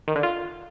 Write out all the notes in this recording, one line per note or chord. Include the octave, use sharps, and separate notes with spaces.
D#3
D3
F4